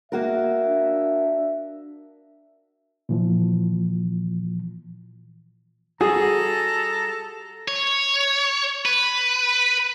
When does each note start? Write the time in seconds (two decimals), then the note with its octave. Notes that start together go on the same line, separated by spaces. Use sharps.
0.12 A#3 F#4 A#4 E5
0.67 D4
3.09 A#2 E3 F3
6.01 G3 F#4 G#4 A4 A#5
7.68 C#5
8.85 B4